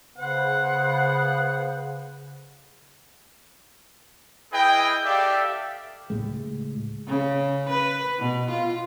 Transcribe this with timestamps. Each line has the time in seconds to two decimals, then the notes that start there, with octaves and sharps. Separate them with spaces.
0.18 C#3 B3 C5 F#5
4.52 E4 G#4 B4 D#5 G5
5.04 G4 A4 D5 E5 F5 G5
6.10 C#2 A2 G#3
7.07 C#3
7.69 B4
8.19 B2
8.50 F4